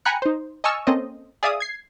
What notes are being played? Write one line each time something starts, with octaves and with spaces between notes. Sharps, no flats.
G5 G#5 A#5 B5 F#6 C#7
D#4 C5
D#5 G#5 A5 C#6 E6 F6
A#3 C4 C#4 A4 C5 D#5
G#4 D5 E5 F5 D#6
G#6 C7